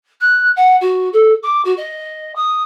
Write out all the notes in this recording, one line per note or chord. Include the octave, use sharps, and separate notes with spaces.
F#6
F#5
F#4
A4
D6
F#4
D#5
D#6